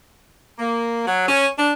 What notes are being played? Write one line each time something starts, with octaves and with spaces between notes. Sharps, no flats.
A#3
F#3
C#4
D4